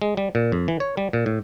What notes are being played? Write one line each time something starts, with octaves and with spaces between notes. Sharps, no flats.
G#3
G3
A#2
F2
E3
C#5
G3
A#2
A2